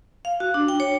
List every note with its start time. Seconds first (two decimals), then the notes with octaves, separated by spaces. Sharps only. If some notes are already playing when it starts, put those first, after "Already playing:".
0.25 F5
0.40 F#4
0.54 D4
0.68 G5
0.80 C#5